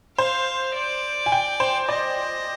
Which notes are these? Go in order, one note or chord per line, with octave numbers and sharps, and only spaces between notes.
C5 F5
D5
G#5
G5
C5
D5 D#5